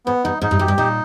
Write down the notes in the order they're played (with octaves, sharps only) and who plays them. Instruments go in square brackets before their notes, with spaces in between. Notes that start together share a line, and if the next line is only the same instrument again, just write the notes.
[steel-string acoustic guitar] G#2 [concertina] B3
[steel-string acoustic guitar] G2 [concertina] D#4
[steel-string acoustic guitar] G#2 [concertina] D#4
[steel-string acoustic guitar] G2
[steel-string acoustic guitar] F#2 [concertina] G4
[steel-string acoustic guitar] G2
[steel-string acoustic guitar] A#2 [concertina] D#4